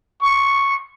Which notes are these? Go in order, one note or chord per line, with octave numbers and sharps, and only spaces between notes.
C#6